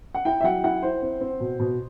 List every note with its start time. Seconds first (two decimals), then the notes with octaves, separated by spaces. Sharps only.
0.15 F#5
0.25 E4 G5
0.41 E5
0.44 F#3 F#5
0.64 E4 F#5
0.83 E4 C5
1.02 C4
1.21 C4
1.40 B2
1.60 B2